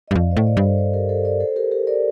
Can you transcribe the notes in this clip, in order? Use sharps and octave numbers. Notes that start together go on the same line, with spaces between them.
G2 D#5
F2 D5 F5
C5 D#5
A2
A#4 D5
G2
A4 C5
A4 C5
G4 A#4
A4 C5
A#4 D5
A4 C5
G4 A#4
G4 A#4
A#4 D5